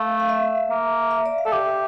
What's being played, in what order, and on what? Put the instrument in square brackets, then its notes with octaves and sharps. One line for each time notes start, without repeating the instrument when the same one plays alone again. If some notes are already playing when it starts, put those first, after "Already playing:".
Already playing: [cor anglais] A3 [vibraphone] F5
[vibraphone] F5
E5
[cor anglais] A#3
[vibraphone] E5
D5
F5
[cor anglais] A4
[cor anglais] G4 [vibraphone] E5